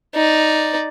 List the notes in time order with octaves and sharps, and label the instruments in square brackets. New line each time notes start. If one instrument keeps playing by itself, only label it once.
[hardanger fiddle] D#4 D5